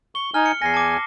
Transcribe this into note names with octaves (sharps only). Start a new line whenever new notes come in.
C#6 G7
D#4 G#5 F6
C#7
E2 G#5 A#6 C7
A5 D6